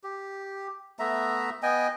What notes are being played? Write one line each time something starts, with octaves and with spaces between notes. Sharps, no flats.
G4
A3 B3 E5 A#5
B3 D#5 G5 G#5